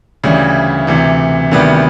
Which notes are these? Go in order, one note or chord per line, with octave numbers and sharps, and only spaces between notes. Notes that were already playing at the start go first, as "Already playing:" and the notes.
D2 C#3 E3 G3
D2 C3 E3
D2 C3 D#3 G3 B3